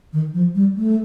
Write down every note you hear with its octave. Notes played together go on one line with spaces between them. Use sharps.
D#3
F3
G3
A3